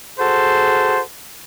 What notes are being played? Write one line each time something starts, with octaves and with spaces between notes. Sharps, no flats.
F#4 G#4 A4 C5